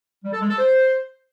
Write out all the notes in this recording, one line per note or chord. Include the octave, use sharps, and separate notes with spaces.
G3
A4
G#3
A4
C5